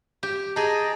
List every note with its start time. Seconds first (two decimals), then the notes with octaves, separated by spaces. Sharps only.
0.23 G4
0.56 G#4 D#5 G5 A5 A#5